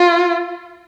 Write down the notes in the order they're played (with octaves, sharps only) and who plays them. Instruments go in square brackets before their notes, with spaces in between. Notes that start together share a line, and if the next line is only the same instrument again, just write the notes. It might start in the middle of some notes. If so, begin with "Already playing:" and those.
Already playing: [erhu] F4